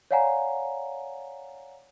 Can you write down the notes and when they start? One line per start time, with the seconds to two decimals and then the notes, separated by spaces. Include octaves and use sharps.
0.11 C#5 D5 F5 F#5 G#5 A#5